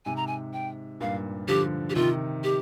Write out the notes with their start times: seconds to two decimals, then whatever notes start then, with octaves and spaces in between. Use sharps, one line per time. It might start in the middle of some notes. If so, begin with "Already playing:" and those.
0.05 G#2 C3 G#5
0.16 A#5
0.27 G#5
0.53 G5
1.00 G2 A#2 F5
1.48 D3 F3 G4
1.90 G4
1.95 C3 D#3 F4
2.44 G4